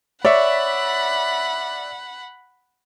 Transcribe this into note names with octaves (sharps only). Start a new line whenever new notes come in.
C#5 D5 E5 F#5 B5